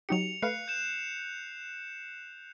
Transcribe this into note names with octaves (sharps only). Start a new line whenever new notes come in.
F#3 D#4 G4 C#7 F7
A3 B4 F5 F#6 C7 C#7
G6 E7